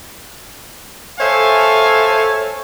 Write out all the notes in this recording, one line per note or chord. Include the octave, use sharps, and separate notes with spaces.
A4 C5 C#5 E5 F5 G#5